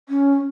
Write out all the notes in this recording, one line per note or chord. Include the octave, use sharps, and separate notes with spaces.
C#4